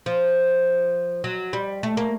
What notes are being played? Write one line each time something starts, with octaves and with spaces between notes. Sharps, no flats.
F3
F#3
G3
A3
A#3